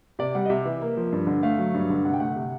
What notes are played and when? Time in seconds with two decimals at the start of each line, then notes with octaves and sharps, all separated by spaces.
0.19 C3 D5
0.35 G3 F#5
0.46 D#5
0.50 C3 E5
0.65 E3
0.82 A#3
0.97 F3
1.12 G2
1.27 D3
1.43 A3 F5
1.59 F#3
1.75 G2
1.90 D3
2.05 C3 F#5
2.14 G5
2.20 A3 F#5
2.36 C3